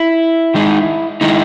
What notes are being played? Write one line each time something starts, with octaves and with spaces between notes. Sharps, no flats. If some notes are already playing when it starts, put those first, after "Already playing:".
Already playing: E4
D#3 G#3 D#4
D#3 G#3 D#4 E4